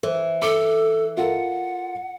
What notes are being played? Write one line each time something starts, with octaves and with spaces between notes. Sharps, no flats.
E3 C5
A4 D6
F4 A4 A#4 F#5